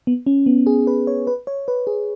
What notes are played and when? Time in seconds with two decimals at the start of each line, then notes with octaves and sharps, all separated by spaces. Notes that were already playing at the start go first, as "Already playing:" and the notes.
0.07 B3
0.26 C#4
0.46 B3
0.67 G#4
0.87 B4
1.07 C#5
1.27 B4
1.47 C#5
1.68 B4
1.87 G#4